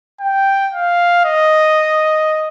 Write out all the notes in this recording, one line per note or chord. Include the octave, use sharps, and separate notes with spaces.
G5
F5
D#5